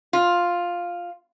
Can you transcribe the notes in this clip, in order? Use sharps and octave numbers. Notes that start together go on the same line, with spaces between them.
F4